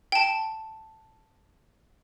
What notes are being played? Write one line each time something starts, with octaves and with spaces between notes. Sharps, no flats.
G5 A5